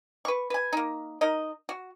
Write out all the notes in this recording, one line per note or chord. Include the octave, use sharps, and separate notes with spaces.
B4 C#6
B4 G#5
A#3 D#4
D#4 A#4 D#5
F#4